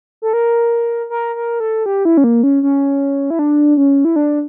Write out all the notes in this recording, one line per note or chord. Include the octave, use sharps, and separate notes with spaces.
A4
A#4
A#4
A#4
A4
G4
E4
C#4
A#3
C#4
C#4
E4
D4
C#4
E4
D4